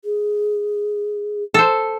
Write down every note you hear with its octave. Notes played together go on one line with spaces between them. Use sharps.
G#4
A4 C5